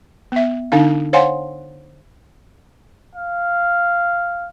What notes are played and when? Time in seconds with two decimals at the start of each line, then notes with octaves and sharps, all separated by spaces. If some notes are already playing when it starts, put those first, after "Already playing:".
0.32 B3 E5
0.72 D3 D4 D#4 F5
1.13 C5 C#5 F5 F#5 G#5 C6
3.15 F5